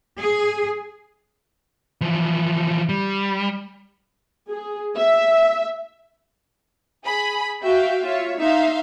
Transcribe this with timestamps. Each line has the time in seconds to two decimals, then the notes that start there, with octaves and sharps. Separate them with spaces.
0.19 G#4
2.01 E3 F3
2.89 G3
4.49 G#4
4.97 E5
7.05 G#4 B5
7.62 F#4 E5 F5 G5
8.03 F4 C#5 E5
8.38 D#4 E5 F5 C6